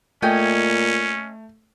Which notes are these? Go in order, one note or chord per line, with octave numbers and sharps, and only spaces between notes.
A#2 A3 C#4 D#5 G5 G#5